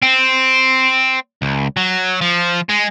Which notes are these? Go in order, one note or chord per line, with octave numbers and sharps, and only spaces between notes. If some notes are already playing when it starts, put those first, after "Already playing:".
C4
C#2
F#3
F3
G#3